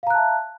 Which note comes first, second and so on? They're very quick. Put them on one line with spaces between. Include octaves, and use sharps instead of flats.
F5 A#5 F#6 A5 E5